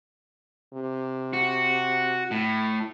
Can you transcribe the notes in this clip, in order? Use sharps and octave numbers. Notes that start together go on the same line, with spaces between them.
C3
F#4
A2